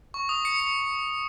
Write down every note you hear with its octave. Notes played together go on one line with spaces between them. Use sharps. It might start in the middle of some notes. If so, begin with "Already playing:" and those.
C#6
D#6
C#7
C#7